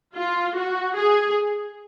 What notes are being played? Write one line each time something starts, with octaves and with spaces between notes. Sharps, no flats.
F4
F#4
G#4